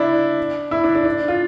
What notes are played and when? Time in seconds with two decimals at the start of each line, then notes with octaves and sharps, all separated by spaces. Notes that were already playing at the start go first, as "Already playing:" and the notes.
Already playing: D4 E4
0.71 E4
0.84 D4
0.95 D4
1.05 D4
1.28 F4